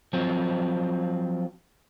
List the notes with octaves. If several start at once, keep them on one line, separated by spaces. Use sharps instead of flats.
F3 F#3 C4